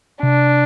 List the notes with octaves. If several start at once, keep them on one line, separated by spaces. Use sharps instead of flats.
C3 D4